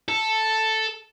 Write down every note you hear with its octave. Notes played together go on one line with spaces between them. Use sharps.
A4